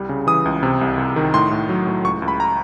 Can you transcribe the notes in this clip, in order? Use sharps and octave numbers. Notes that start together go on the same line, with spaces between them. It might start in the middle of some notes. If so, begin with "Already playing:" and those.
Already playing: C2 G3
C#3
E3 D#6
C#2
C3
C2
C2
D#3
A2 C6
A2
F#3
A2
C#2 C#6
C#2
B5
A#5